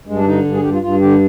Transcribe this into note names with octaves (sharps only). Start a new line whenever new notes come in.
G2 G#3
D4
D3 D#4
G2
G#4
G2 G4
F4
G2 F4
D3 G4